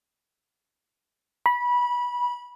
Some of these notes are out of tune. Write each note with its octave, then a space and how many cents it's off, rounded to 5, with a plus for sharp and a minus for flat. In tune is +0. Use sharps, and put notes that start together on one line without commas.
B5 -20